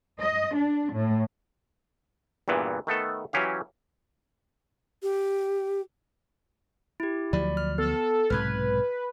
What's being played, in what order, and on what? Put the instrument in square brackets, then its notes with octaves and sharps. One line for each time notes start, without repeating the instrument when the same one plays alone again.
[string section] D#5
D4
A2
[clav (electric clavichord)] E2 G2 A#2 E3 B3
D#3 A3 B3 A4
E3 F#3 C#4 G4 F5
[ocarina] G4
[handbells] E4 G4
[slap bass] D2 F3 F#3 [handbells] D5 B5
[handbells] F6
[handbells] B3 [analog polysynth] A4
[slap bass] B1 G#2 C3 [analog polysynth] B4 [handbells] F6 G#6